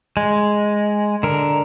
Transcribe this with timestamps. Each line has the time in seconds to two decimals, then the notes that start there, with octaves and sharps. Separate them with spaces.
0.17 G#3
1.23 D3 A#4